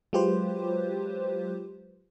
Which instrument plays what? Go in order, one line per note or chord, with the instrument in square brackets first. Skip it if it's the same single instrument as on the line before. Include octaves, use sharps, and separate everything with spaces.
[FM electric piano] F#3 G#3 F4 G4 B4 C5